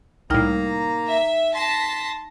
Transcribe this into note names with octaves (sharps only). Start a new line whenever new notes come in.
C2 A2 A#3 D#4 G5 A#5 F6
E5
A5 C6 A#6 B6